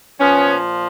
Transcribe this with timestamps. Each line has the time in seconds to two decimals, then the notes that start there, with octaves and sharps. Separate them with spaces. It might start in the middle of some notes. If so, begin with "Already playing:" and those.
0.19 A#2 F3 B3 C#4